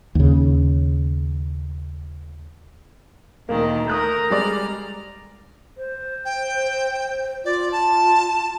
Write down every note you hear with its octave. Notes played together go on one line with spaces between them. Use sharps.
D#2 C#3
D2 A#2 D#3 A#3
A3 A#4 D#6 F#6 G6
G3 G#3 D5 A#5 F6
C5
G5
F4 D5
A5